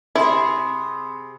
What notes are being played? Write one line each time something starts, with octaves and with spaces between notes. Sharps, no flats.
C3 E4 G#4 B5 C6 D#6